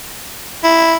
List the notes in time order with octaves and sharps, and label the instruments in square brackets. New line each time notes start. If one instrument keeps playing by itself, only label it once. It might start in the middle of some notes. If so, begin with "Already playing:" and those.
[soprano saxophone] E4